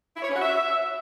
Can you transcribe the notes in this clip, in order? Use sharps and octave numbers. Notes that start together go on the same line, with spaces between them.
E4
C#5
C#4
F#4
E5